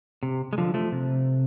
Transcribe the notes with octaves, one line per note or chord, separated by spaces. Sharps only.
C3
G#3
D3 F3
F3 A3
C3